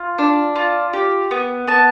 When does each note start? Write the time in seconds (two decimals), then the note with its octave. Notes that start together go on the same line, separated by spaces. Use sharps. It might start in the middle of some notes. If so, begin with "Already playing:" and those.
Already playing: F4
0.18 D4
0.56 F4
0.93 G4
1.31 B3
1.67 B3 A5